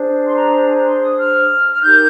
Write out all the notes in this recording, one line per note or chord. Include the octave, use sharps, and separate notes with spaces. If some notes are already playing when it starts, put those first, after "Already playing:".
Already playing: D4 G#4 C5
C6
A#5
C6
D#6
F6
F6
D#4 G4 A#4 G6